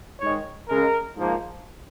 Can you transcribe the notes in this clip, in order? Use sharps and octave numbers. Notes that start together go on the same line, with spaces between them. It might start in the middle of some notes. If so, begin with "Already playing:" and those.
G#2 D#3 G#3 C#5
C#3 G#3 A#4
G#2 F3 A#3